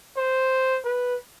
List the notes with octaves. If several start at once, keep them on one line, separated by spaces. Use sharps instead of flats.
C5
B4